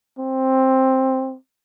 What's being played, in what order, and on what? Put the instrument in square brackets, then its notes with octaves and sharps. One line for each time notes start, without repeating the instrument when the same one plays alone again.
[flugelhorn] C4